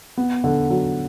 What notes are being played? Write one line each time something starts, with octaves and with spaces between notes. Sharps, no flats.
B3
D3
F#3